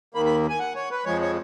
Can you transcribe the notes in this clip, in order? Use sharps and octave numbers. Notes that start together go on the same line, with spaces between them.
D#2 D#3 A#3 B5
B5
G#5
F#5
C#5
B4
F2 F3 G#3 C#5
C#5